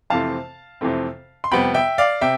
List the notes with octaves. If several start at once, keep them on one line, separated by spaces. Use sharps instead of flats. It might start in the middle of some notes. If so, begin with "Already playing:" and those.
F2 C3 E3 A3 C4 F5 A5
F2 C3 E3 A3 C4
C6
F2 C3 G3 B3 G5 B5
E5 G5
D5 F5
C3 E5 G5